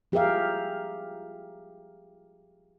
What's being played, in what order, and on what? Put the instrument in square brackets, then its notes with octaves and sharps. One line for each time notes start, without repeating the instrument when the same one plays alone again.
[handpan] F3 G4 G#4 A#4 E5 F5